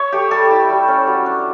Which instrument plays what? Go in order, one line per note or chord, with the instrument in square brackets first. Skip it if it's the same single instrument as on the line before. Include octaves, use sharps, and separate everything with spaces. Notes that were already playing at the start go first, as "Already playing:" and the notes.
Already playing: [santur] C#5 E5
A3 G4
G3 A4
E4
G3
C#4
F#3
D4